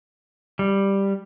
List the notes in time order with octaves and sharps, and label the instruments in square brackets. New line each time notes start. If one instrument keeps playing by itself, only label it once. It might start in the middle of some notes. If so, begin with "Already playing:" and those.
[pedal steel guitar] G3